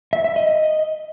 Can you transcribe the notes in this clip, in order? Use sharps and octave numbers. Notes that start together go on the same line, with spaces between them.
E5
E5
D#5